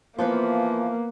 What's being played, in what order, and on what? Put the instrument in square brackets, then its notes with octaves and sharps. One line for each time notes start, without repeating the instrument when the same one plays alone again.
[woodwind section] E3 F3 [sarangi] A#3 [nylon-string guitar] B3 B4 C5